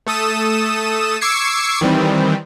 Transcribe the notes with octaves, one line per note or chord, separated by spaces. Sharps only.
A3 A4 D#6 E7
C#6 D6 E6 G#6 C7 C#7
D#3 E3 G3 C4